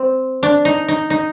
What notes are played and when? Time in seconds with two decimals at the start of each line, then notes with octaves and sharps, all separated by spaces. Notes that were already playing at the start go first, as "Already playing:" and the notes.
Already playing: C4
0.43 D4
0.65 D#4
0.88 D#4
1.10 D#4